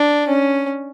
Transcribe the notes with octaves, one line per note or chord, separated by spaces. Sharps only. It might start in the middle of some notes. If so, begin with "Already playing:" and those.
Already playing: D4
C#4